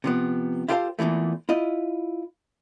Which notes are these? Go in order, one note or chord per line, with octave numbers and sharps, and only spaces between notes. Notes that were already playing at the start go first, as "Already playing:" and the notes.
C3 F3 B3
E4 F4 G4 A4 C5 F5
E2 A#2 C#3 E3 A3
E4 F4 D#5